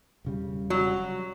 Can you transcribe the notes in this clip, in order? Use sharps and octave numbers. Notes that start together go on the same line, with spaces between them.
E1 C#3 G3
F#3